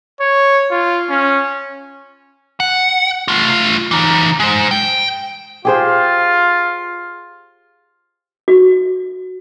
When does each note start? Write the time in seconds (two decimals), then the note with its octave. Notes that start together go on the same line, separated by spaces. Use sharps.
0.21 C#5
0.71 F4
1.10 C#4
2.60 F#5
3.28 A3 F4
3.91 E3 D#4
4.40 G#3 C5
4.71 G5
5.65 F4 G4 G#4 C5
8.48 F#4